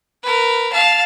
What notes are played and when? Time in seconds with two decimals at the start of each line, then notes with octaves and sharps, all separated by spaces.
0.23 A#4 B4
0.72 F5 A5